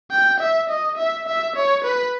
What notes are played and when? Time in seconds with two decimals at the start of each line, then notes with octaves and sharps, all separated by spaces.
0.11 G5
0.40 E5
0.69 D#5
0.97 E5
1.27 E5
1.56 C#5
1.84 B4